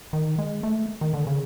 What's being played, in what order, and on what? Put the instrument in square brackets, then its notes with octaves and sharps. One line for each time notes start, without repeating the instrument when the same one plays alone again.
[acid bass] D#3
G#3
A3
D#3
D3
C#3